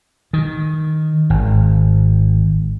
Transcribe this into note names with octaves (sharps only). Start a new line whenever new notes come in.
D#3
G#1